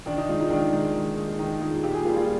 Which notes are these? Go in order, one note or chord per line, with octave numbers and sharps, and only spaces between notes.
D#3 D4
D#4
G#3 F4
D#4
D#3 D4
G#3
D#3
G#3
D#3 D#4
G#3 F4
A#2 G4
G#4
G3 A#3 F4
F4